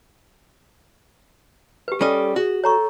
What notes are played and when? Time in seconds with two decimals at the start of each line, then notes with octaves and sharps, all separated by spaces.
1.88 G4 B4
2.01 G3 C#4 A4 D#5
2.36 F#4 G#4
2.64 A4 C#5 A#5 C#6